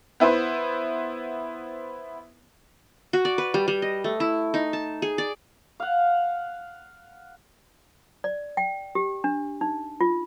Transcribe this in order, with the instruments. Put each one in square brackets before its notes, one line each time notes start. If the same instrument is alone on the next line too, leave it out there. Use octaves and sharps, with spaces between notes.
[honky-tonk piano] B3 E4 B4 C5
[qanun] F#4
D5
B4
G3
G3
D#5
A3
E4
D#4
A5
G#4
D5
[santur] F5 F#5
[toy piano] D5
G5
G4
D4
D#4
F4